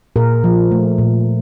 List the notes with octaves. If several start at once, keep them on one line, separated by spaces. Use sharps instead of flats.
A#2 G#4 A#4
F3
A3
A#2